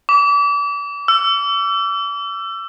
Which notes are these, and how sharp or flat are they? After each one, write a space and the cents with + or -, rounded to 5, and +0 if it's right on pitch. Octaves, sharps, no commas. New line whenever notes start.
D6 -35
E6 +30